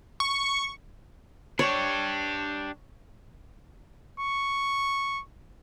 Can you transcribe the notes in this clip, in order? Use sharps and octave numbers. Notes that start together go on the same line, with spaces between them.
C#6
D4 G4 C#5
C#6